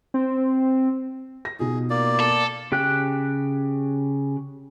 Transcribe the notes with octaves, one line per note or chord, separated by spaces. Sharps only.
C4
A#6
B2 D#4 F4 G#4
A#3 D5
A4
C#3 G4 G5 F#6